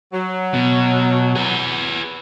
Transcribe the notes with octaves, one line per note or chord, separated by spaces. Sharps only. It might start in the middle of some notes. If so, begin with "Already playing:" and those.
F#3
B2
G#4 B4